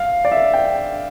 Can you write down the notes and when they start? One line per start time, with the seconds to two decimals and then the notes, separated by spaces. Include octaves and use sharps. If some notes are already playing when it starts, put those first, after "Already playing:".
Already playing: F5
0.25 D5
0.32 E5
0.53 G5